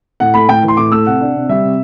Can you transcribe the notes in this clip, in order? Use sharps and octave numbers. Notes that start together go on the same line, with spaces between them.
A2 F#5
A3 B5
A2 G5
E3
C6
A2 D6
A3 E6
C3 F#5
D4
C3
G3 E5
C3